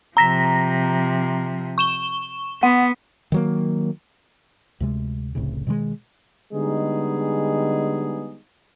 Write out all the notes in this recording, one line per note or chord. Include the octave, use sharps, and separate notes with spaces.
C3 F3 A#5 A#6 B6
C#6 E7 G7
B3 F#5
D#3 F#3 A#3
D2 C3 G#3
F1 C2 A2 C#3
B2 D#3 G3 G#3
D3 G3 G#3 B3 D#4 G#4